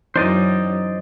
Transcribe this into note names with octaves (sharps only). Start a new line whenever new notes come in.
F#2 E3 C#4 D#4 C5 D5 D#5